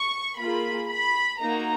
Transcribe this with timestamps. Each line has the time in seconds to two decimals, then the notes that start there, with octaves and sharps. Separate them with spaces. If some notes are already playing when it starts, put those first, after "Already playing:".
Already playing: C#6
0.39 A#3 F4 G#4 B5
0.89 B5
1.39 A#3 D#4 F#4 A#5